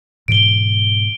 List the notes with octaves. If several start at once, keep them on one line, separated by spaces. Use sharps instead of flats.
G#2 B2 E3 D7 G7